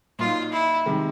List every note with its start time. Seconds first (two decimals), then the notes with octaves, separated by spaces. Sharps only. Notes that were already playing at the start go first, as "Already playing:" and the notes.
0.19 A#2 F#3 A#3 D#4 F4
0.53 E4
0.86 C3 D#3 G#3